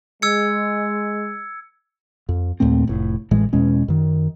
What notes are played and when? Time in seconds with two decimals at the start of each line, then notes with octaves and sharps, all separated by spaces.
0.22 G#3 E6 G#6 C#7
2.29 F2
2.60 D#2 A#2 A3 C4
2.87 F1 A2
3.31 A1 A2 E3 G#3
3.53 E2 B2 G#3 C#4
3.88 F#2 D#3